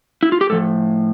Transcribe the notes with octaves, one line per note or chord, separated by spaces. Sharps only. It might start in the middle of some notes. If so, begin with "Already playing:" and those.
E4
F4
G4
A2 F3 A4